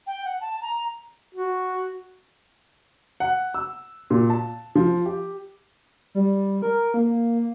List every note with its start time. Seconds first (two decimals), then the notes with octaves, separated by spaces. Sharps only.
0.07 G5
0.25 F#5
0.41 A5
0.62 A#5
1.35 F#4
3.20 F#5
3.54 E6
4.10 A#2
4.30 A5
4.75 F3
5.05 G4
6.15 G3
6.62 A#4
6.94 A#3